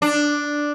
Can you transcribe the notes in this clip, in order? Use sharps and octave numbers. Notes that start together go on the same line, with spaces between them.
D4